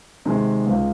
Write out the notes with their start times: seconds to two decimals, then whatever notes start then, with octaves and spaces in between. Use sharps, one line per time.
0.25 C3 D#3 G#3
0.67 C#2